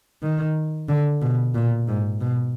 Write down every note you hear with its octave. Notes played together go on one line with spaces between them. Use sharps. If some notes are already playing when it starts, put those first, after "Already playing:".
D#3
D3
B2
A#2
G#2
B2